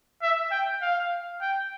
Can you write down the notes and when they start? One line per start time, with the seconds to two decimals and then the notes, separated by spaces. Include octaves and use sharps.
0.22 E5
0.51 G5
0.82 F5
1.41 G5